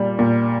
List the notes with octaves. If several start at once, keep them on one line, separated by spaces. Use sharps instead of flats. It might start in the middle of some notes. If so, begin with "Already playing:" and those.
Already playing: A#2 G3
A#2